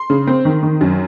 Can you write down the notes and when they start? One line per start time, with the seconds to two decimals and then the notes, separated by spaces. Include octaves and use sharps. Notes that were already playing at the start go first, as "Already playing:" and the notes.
Already playing: C6
0.10 C#3
0.27 C4
0.45 D#3
0.63 D#3
0.81 F#2